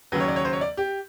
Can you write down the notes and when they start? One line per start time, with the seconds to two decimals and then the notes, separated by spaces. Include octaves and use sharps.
0.12 D#2 C#3 F#3 B4
0.20 C#5
0.28 D5
0.36 C#5
0.45 C5
0.53 C#5
0.61 D5
0.77 G4